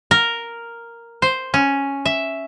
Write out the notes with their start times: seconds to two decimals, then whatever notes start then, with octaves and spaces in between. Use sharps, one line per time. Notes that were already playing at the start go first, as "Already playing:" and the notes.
0.11 A#4
1.22 C5
1.54 C#4
2.05 E5